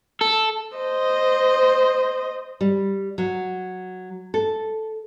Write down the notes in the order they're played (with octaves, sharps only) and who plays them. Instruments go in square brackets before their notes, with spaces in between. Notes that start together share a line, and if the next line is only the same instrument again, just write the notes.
[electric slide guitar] A4
[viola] C5 D#5
[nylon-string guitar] G3
F#3
A4